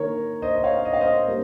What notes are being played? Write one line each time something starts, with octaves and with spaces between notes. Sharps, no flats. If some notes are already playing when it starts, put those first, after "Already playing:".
Already playing: D#3 A#3 A#4 C#5
C5 D#5
D#5
C#5 F5
D#5
F5
C5 D#5
G3 A#3